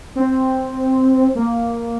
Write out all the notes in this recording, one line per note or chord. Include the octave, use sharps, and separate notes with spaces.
C4
A#3